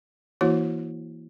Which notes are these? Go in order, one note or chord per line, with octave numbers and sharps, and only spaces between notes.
E3 A#3 E4 F#4 C#5